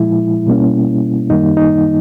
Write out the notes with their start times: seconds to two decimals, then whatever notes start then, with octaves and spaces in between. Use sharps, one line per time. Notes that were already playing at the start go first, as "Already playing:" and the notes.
Already playing: A#2 F3 G#3 E4
0.47 B2 G3 A#3 C#4
1.30 F#2 D#3 G3 A#3 D#4
1.57 D#4